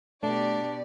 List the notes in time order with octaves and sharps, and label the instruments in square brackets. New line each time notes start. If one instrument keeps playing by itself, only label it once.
[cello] B2 G4 [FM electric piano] A3 [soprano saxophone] D4 [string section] D5